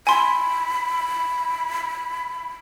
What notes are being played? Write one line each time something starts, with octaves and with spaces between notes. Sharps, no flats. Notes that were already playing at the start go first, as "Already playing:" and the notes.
G#5 B5 C6